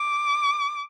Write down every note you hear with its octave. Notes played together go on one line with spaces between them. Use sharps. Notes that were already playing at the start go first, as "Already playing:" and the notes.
Already playing: D6